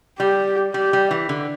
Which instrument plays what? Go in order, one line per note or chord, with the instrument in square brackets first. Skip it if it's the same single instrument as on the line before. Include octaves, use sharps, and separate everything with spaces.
[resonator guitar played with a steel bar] G3 [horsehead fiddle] G4
[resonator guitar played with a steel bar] G3 [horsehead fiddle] G4
[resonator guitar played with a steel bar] G3
E3
D3